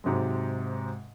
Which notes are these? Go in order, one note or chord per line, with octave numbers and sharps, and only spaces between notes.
G#2 C3 F#3 G#3